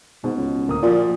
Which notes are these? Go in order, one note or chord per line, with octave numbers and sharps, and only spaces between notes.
G#2 B2
C#2
D1 A#3 D#6
A#2 F3 F#4 D5